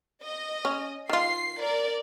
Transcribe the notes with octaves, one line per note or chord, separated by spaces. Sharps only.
D#5
C#4
D#3 F4 C7
A#4 D5